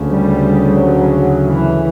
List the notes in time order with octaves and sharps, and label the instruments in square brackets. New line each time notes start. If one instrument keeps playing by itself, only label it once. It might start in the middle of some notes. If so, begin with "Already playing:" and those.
Already playing: [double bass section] D2 C#3
G3
F#3
E3